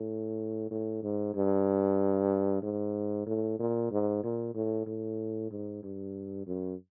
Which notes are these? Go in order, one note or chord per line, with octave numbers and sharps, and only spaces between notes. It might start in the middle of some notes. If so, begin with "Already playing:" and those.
Already playing: A2
A2
G#2
G2
G#2
A2
A#2
G#2
A#2
A2
A2
G#2
G2
F#2